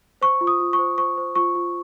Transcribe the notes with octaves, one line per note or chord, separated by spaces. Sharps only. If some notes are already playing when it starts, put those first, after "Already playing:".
C5 C#6
F4
D#6
F4
C#6
C5
C5 C#6
C5
F4 C#6
F4